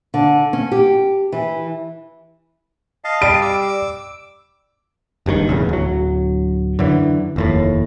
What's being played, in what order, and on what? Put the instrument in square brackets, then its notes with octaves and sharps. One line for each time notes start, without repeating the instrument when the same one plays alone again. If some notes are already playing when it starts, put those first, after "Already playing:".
[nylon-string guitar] D3
C#4
G4
E3
[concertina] D#5 F5 A5
[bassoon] G3 [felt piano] D7
[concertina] D6 E6
[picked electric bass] F#1 G2 B2 D#3
E1 A1 E2 C#3
D1 F#3
F#2 D3 E3
F1 D#2 A2